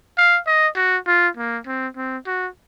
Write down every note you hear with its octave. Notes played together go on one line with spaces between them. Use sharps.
F5
D#5
F#4
F4
A#3
C4
C4
F#4